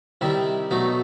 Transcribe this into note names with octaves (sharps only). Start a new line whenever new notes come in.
C3 D#3 G3 E4
B2 F#3 A3 D#4